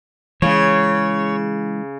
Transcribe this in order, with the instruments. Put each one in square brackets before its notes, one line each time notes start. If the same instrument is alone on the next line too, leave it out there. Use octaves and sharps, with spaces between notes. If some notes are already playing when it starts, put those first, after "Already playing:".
[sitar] C#3 [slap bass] E3 G#3 [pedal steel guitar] C#5